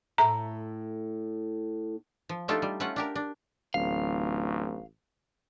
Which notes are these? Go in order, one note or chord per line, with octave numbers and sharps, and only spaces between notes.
A2 A3 E4 A#5
F3
A3 D4 D#4 F4 G4 A4
G3
A3 C#4 F4 F#5
D4 G4 A#4
D4
D1 A1 F5